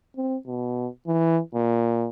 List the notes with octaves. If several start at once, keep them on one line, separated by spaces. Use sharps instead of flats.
C4
B2
E3
A#2